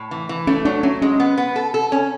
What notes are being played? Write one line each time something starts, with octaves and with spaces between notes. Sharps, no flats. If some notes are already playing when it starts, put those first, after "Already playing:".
Already playing: A2
E3
E3
A3 C#4
F#3 D4
F#3 C#4
G#3 C#4
B3
B3
A4
A4
C#4